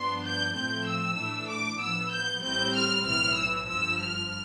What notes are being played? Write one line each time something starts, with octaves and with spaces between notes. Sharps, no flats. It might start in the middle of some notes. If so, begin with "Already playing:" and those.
Already playing: G2 F3 B3 D4 C6
G6
A2 F3 A3 C4 G6
E6
A2 E3 A3 D4
D6
A2 F3 B3 E6
G6
A1 A2 G3 C4 G6
F6
B1 A2 E3 F6
E6
G1 G2 F3 E6
F6